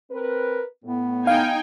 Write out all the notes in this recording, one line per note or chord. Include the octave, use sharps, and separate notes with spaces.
C4 A#4 B4
A2 B3
D#4 F5 G5 G#5